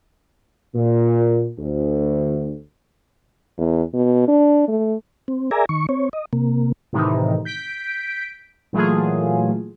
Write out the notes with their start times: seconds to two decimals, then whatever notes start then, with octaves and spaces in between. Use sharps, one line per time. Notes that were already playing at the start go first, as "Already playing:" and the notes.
0.75 A#2
1.59 D2
3.58 E2
3.94 B2
4.28 D4
4.68 A3
5.28 C4
5.51 G#4 A#4 D5 E5 G#5 A#5
5.69 D#3 C#6
5.89 C4 C#5
6.13 D#5
6.33 C3 A#3
6.93 A2 C3 D#3 E3 D#4
7.45 G6 B6 D7
8.73 A#2 E3 F#3 A3 F4 G#4